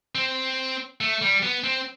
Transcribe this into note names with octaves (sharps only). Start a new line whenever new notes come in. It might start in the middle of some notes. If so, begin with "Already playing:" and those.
C4
A3
G3
B3
C4